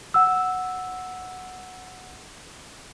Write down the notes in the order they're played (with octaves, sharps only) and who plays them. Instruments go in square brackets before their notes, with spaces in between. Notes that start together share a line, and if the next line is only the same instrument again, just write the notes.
[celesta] F#5 E6